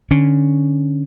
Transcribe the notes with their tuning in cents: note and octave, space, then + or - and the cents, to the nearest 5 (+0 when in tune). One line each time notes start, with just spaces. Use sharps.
D3 +15 C#4 +0